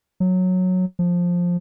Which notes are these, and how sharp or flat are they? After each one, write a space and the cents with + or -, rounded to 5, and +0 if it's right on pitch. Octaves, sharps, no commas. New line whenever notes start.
F#3 -10
F3 +10